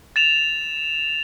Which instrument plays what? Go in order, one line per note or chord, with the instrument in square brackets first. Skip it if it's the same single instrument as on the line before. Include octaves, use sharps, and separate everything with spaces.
[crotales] A6 E7 F7